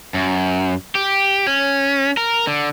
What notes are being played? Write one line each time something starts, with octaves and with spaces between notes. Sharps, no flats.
F#2
G4
C#4
A#4
D3